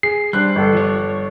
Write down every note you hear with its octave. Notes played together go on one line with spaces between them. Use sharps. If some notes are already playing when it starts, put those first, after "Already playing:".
G#4 C7
G3 D4 C5 F#6
G1 A4
F3 C#5